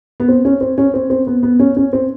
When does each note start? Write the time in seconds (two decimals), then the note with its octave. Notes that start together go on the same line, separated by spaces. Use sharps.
0.20 B3
0.28 C4
0.45 C#4
0.61 C4
0.78 C#4
0.94 C4
1.10 C4
1.27 B3
1.43 B3
1.59 C#4
1.77 C#4
1.93 C4